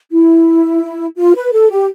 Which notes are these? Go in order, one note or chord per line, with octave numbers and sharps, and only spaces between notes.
E4
F4
B4
A4
G4